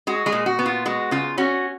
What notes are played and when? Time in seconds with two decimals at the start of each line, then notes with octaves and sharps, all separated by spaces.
0.07 G#3 F#4
0.26 G#3 G#4
0.32 A#2
0.46 F#4
0.59 B3
0.66 F4
0.86 G#3 F#4
1.11 C#3 F4
1.38 C#4 F#4